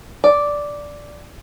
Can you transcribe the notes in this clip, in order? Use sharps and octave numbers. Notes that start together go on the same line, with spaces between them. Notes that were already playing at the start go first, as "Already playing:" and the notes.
D5